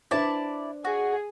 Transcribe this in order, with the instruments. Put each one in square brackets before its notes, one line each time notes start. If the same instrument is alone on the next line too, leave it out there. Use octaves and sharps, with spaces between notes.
[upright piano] D4 B4 C5 [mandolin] E4 D5 A5
[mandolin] F#4 [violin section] G#4